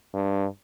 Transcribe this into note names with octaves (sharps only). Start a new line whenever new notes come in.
G2